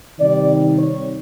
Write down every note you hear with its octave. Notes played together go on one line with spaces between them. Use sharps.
C3 D#3 G3 C4 D#4 D5
C#5